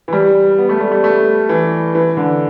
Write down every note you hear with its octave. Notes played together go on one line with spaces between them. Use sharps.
E3
G3
B3
A3
G3
A3
A3
E3
E3
D3